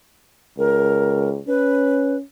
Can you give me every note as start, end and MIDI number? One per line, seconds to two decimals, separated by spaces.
0.58 1.40 37
0.58 1.30 70
1.48 2.22 61
1.48 2.17 71